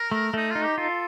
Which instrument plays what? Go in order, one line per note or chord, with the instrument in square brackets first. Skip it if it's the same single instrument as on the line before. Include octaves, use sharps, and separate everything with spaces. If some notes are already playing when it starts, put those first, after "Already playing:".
Already playing: [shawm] A#4
[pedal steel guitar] A3
[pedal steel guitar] A3 [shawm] D#4
[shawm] F4
[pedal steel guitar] D#4
[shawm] G4
[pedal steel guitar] F4 [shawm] A4